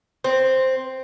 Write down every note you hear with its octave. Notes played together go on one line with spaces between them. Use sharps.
C4